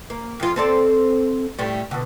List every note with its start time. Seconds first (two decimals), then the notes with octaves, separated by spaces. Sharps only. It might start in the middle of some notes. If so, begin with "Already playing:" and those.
0.10 A#3
0.40 F2 F4
0.56 C4 A4 D5
1.59 A2 G3
1.91 B2 D3